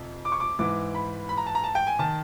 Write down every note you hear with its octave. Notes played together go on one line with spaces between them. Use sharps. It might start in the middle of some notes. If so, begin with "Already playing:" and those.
Already playing: F2 C3
D6
C#6
D6
G#2 E3 D6
B5
B5
A#5
A5
A#5
A5
G5
G#5
D#3 A5